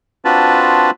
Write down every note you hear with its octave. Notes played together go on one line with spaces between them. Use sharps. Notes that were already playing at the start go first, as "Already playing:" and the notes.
C4 D4 F4 F#4 B4 A5